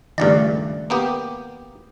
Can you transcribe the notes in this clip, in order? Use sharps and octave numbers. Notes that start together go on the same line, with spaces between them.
G#1 C#2 G2 D#3 A3 D5
A#3 B3 G4